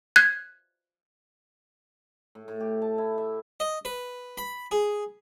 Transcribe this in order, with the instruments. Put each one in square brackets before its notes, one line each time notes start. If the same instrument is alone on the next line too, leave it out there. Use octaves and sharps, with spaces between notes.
[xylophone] F#6 G#6
[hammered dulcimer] A2
A2
G4
A5
E4
E5
[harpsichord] D#5
B4
B5
G#4